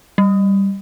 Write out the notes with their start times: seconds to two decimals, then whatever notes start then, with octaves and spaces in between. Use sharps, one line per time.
0.18 G3